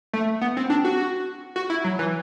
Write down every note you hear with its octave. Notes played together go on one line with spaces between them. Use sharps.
A3
B3
C4
D4
F#4
F#4
E4
F#3
E3